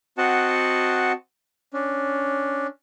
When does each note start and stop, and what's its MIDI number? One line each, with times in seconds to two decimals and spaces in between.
0.18 1.12 60
0.18 1.12 66
0.18 1.12 75
0.18 1.12 78
0.18 1.12 81
1.73 2.67 61
1.73 2.67 62